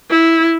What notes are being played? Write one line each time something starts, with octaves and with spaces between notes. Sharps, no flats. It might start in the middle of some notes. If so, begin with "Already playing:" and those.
E4